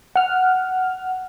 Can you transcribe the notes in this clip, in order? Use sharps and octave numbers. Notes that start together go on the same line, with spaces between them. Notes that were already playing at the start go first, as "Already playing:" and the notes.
F#5 F6